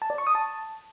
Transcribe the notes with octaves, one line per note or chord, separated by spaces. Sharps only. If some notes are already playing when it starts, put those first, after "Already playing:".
A5
D5
C#6
D#6
A5